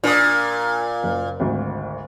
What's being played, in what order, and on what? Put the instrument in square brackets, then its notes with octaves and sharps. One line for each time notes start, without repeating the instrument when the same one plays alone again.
[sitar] A#2 [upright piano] D4 D#6
[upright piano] F#1
G#1 D2